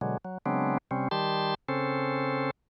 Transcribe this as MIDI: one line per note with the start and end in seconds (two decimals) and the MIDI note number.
0.01 0.17 47
0.01 0.17 50
0.01 0.17 54
0.01 0.17 56
0.25 0.38 54
0.46 0.78 49
0.46 0.78 54
0.46 0.78 56
0.46 0.78 59
0.46 0.78 60
0.46 0.78 62
0.91 1.08 48
0.91 1.08 55
0.91 1.08 60
0.91 1.08 61
1.11 1.55 51
1.11 1.55 55
1.11 1.55 67
1.11 1.55 81
1.11 1.55 84
1.68 2.51 49
1.68 2.51 60
1.68 2.51 61
1.68 2.51 69
1.68 2.51 72